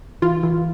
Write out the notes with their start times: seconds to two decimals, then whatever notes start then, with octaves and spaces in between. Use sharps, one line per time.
0.22 E3 F4
0.43 E3